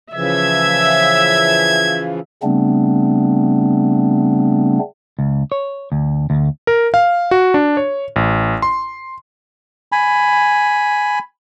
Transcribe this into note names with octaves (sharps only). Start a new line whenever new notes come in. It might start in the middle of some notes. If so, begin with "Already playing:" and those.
C#3 E3 F3 E5 G#6
C#3 G3 A3 B3 C4 D4
C#2
C#5
D2
D2
A#4
F5
F#4
D4
C#5
A1
C6
G#5 B5